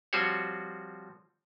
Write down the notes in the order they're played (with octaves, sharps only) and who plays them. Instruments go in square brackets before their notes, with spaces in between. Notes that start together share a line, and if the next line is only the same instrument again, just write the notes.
[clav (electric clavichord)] F3 G3 C4 F#4 C5 C#5